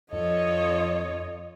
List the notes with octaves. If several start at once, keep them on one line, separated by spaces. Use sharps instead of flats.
F2 F3 F4 A4 C#5 D#5